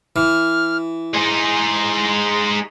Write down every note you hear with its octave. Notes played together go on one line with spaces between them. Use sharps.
E3 F6
G#3 D#4 C6